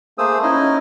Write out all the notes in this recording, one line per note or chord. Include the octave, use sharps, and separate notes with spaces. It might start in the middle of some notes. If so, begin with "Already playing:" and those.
A3 A#3 G#4 C5 D#6 E6
C#4 D#4 E4 D#5 G#5